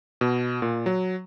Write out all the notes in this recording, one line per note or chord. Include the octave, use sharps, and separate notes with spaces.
B2
A#2
F#3